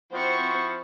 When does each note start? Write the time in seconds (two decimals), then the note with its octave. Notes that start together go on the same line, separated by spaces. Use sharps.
0.13 F3 C4 E4 F#4 C5 C#6